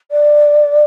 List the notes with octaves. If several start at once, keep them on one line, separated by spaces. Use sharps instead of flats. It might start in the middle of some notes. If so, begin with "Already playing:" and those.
D5